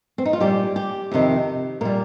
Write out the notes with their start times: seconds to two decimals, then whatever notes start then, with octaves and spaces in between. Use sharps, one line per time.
0.18 C4
0.25 D#4
0.33 F4
0.40 A#2 G3 G4
0.76 G4
1.12 F2 C3 D#3
1.81 A#2 G3 A#4